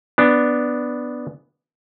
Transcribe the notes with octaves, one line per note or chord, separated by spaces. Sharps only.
B3 D4